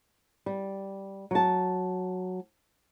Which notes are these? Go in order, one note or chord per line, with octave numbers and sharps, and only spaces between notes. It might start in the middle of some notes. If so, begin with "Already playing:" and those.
G3
F#3 A5